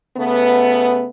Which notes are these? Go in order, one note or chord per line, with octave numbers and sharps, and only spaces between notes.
C#3 A3 B3